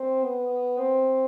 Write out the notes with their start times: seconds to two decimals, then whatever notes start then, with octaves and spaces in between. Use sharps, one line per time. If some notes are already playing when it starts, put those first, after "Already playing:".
Already playing: C4
0.24 B3
0.78 C4